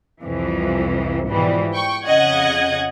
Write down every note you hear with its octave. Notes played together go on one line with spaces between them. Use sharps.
C2 F2 E3
G#2 B2 E3 F3 G3
G5 C#6
F2 C#3 D#5 F#5 G#6